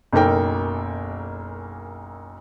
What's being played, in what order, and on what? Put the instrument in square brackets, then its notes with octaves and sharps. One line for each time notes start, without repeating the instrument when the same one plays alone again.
[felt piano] F#1 B1 A4 A#4 G5